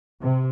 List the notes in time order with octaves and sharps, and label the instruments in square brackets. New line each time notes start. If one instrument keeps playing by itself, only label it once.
[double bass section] C3